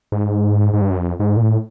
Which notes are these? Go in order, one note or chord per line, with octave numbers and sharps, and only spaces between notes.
G#2
G#2
G2
F#2
F2
G#2
A#2
A2